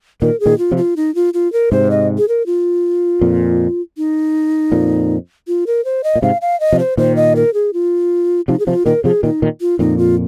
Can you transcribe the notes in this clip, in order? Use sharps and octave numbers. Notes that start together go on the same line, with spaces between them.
A#2 D#3 A#4
G#4
A#2 D#3
F4
C3 F3
F4
D#4
F4
F4
A#4
G#2 C3 C5
D#5
G#4
A#4
F4
F2 A#2
D#4
F2 A#2
F4
A#4
C5
D#5
A#2
G#2 C3 F5
F5
D#5
C3 F3
C5
A#2 D#3 C5
D#5
A#4
G#4
F4
C3 F3 D#4
G#4
C3 F3 F4
A#2 D#3 A#4
C3 F3 G#4
A#2 D#3 D#4
A#2 D#3
F4
F2 A#2 D#4
F4